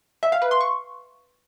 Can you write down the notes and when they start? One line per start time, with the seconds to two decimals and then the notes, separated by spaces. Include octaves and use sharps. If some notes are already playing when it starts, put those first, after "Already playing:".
0.23 E5
0.32 F5
0.42 B4
0.51 C6
0.61 C#6